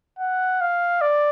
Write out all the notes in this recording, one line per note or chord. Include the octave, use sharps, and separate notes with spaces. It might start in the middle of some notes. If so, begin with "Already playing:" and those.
F#5
F5
D5